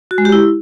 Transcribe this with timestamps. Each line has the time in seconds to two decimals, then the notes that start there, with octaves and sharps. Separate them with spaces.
0.11 F#4
0.18 G#3
0.25 G4
0.32 E4